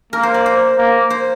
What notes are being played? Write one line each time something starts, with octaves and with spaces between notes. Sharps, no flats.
A#3 A#4
C5
D5
C5
A#3
C5